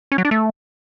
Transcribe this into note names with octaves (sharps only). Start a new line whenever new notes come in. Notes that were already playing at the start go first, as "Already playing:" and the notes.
C#4
F#3
D4
A3